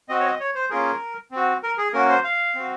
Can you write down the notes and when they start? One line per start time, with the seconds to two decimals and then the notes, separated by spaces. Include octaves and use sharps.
0.09 C4 F#4 D#5
0.20 C#5
0.24 D#5
0.40 C#5
0.55 C5
0.70 A#3 C#4 F4 G#4 A#4
1.31 C4
1.36 F#4
1.63 A#4
1.78 G#4
1.93 A#3 C#4 F#4 A#4
2.09 C5
2.24 F5
2.55 C4 F#4